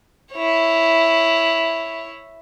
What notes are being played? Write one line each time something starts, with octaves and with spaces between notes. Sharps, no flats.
E4 C#5